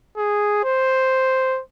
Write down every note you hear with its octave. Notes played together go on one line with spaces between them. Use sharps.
G#4
C5